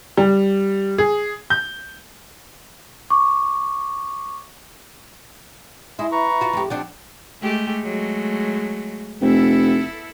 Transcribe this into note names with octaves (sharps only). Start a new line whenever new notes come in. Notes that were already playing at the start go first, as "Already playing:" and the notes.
G3
G#4
G6
C#6 D6
E4 G#4 D#5 C6
B4 A#5 C#6
F4 F#4
F2 G4
F3 C4 D4 D5 F#5 G5
G#3 A3 G4
F#3 G#3 A3
F1 B3 E4 A4